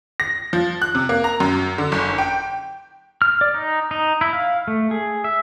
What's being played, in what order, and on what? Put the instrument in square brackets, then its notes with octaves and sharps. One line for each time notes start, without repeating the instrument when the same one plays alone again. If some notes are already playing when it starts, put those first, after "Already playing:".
[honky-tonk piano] A#6
F3
F#6
C3
A#3
A#5
F#2
D3
F#1
G5
[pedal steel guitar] F6
D5
D#4
D#4
E4
F5
A3
G#4
E5